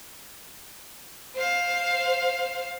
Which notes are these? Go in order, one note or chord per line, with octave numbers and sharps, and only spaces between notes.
C5 F5